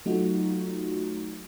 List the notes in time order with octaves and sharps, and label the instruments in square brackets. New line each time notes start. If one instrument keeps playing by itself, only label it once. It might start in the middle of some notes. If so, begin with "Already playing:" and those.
[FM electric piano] F#3 A3 D#4 F4 F#4